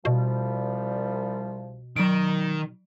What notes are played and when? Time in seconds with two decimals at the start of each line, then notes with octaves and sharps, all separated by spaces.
0.05 C2 B2 F3 G3
1.97 D#3 F#3 D7